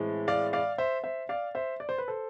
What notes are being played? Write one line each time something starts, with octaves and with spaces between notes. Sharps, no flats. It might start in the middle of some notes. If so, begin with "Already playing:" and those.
Already playing: A2 E3 G#3 C4
D5 F5
D5 F5
C5 E5
C5 E5
D5 F5
C5 E5
D5
C5
B4
A4 C5